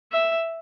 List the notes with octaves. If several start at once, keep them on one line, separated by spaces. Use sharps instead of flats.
E5